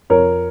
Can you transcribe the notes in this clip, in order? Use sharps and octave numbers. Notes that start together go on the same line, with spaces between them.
F2 A#4 C#5